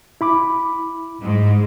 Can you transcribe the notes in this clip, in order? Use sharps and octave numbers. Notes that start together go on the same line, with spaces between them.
E4 B5 D6
G#2